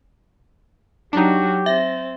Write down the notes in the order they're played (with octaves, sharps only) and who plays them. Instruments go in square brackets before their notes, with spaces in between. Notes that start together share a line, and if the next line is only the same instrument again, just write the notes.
[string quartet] F#3 F#4 [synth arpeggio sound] D4 D#4 [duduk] G4
[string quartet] C4 [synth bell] E5 [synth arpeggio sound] A#6